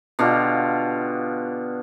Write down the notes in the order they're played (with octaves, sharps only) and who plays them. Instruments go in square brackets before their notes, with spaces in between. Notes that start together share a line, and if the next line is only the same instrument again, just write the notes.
[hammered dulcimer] B2 D3 F4 G4